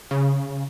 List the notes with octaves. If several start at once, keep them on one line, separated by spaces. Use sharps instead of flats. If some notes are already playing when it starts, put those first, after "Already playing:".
C#3